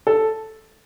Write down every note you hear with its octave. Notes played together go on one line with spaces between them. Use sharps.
A4